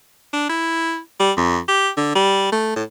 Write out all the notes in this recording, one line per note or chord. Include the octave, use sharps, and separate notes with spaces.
D4
E4
G3
F2
G4
D3
G3
A3
A2